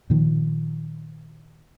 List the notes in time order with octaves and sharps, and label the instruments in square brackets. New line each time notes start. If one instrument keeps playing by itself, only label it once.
[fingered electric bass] A#2 D#3 F3